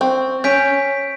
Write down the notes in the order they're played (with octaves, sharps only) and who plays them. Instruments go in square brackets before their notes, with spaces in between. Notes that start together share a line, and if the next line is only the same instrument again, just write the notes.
[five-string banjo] C4 [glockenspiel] C#6
[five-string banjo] C#4 [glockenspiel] G6 B6 D7